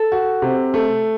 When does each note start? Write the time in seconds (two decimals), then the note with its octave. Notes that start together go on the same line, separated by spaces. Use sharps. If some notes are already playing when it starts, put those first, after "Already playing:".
Already playing: A4
0.12 F#4
0.42 C3
0.74 A3